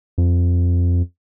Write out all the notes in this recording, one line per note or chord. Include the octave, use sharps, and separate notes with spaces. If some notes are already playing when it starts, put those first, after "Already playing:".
F2